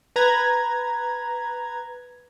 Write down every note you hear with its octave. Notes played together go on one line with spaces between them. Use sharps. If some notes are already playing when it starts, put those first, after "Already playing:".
B4 A#5 G#6